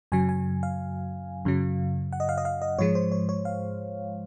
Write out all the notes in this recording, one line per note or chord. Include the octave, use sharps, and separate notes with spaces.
F#2 C#3 F#3 G#5
G#5
F5
F#2 C#3 F#3
F#5
D#5
F5
D#5
F5
D#5
G#2 F3 G#3 C#5
C5
C#5
C#5
F5